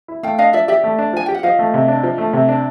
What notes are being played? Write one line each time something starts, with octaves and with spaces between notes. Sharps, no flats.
E4
A3 F5 G5
D4 D#5 F5
F3 D5 E5
G4 D5 E5
A3
D4
F3 G#5
G4 G5
F#5
F3 D#5 F5
A3
C3
D4
F3
A3
C3
D4